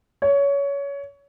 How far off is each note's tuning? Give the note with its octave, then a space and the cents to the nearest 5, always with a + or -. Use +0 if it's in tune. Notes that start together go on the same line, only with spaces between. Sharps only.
C#5 +20